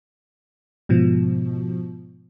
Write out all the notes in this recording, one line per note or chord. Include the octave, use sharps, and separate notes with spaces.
G#2 B2 F3